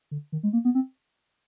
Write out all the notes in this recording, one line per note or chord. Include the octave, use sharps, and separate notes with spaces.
D3
D#3
G#3
A#3
B3
C4